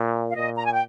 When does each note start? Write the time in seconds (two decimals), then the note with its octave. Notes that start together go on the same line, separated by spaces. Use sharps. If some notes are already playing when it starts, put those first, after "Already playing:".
Already playing: A#2
0.30 F5
0.35 A#2 D#5
0.57 A#5
0.65 G#5
0.73 G5